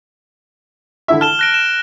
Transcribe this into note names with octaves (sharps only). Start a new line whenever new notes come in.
D3 E4 E5
A5 F6 E7 G7
F#6 A#6 D7
E7